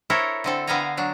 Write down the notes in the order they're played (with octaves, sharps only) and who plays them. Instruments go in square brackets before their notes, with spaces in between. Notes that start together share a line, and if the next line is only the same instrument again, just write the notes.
[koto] E4 A4 A#4 C5 C#5
D3 C4 A4
D3 B3 F5 G5 G#5 A#5
F#3 D4